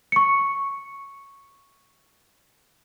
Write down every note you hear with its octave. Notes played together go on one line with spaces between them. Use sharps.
C#6 C#7